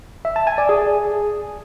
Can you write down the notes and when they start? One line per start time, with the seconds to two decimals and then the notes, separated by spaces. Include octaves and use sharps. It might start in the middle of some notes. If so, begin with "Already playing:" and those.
0.25 E5
0.36 A5
0.47 G#5
0.58 D5
0.69 G#4